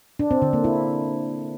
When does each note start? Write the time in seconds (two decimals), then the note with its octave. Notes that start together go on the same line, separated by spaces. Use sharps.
0.19 D4
0.31 C4
0.42 D3
0.53 A#3
0.64 E4